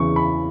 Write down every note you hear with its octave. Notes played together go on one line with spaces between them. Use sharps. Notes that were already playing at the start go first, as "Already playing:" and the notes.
Already playing: E2 C#3 E3 C#6
B5